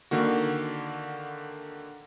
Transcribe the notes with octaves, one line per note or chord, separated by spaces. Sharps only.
D3 D#3 A#3 F#4